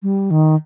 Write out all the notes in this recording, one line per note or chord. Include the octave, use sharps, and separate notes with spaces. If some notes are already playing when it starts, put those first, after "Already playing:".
G3
D#3